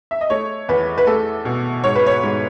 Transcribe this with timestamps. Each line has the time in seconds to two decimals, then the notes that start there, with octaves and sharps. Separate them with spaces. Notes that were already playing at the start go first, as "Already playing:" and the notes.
0.11 E5
0.21 D#5
0.30 A3 C#5
0.69 E2 B4
0.98 B4
1.07 A3 A4
1.45 B2
1.84 G#2 C#5
1.95 B4
2.06 C#5
2.23 G#2